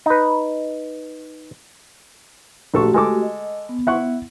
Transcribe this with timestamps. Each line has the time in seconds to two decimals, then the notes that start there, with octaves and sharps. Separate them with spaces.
0.06 D#4 B4
2.74 A#1 A3 F#4 G4 A4 C#6
2.94 G#3 A4 D6
3.22 D#5
3.69 B3
3.87 E4 F#5 C#6